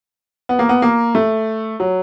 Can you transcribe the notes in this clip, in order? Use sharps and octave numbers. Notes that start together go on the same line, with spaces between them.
B3
A#3
B3
A#3
A3
F#3